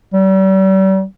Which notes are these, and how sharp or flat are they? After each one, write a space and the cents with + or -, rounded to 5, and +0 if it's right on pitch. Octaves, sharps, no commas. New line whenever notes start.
G3 -40